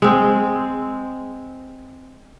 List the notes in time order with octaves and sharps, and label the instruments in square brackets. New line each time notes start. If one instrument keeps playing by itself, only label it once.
[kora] G#3 C4